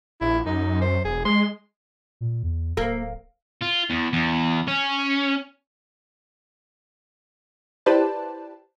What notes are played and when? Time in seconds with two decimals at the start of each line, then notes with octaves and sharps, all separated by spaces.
0.21 A#1 E4
0.46 F#2 D#4
0.82 C5
1.05 E1 G#4
1.25 G#3 C6
2.21 A#2
2.43 E2
2.77 D1 A#3
3.61 F4
3.90 E2
4.13 E2
4.68 C#4
7.86 E4 G4 B4 C5 D5 A5